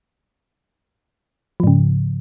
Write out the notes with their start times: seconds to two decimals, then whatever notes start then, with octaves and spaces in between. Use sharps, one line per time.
1.60 F3
1.64 G#2
1.67 C#3